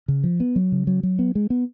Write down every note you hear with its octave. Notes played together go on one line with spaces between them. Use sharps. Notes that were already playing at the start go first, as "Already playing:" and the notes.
C#3
F3
B3
F#3
C#3
F#3
F#3
B3
G#3
B3